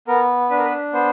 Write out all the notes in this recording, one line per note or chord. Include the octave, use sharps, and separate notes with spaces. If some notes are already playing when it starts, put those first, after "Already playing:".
B3 A#4
D4 B4
A#4
B4
B3 C5